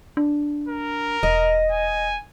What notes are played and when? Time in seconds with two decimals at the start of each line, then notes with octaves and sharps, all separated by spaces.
0.17 D4
0.69 A#4
1.23 E1 D#5
1.71 G#5